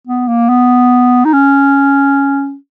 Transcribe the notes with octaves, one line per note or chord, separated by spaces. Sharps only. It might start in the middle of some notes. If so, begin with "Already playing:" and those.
B3
A#3
B3
D#4
C#4